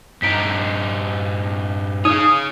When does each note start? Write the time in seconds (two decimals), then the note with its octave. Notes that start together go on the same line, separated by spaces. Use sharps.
0.22 G2 D#4 A#5 B6 D7
2.05 D#4 G#4 C#5 D#6 D#7